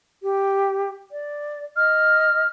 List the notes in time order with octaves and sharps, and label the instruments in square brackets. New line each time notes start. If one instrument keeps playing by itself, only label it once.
[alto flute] G4
D5
[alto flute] D#5 [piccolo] F6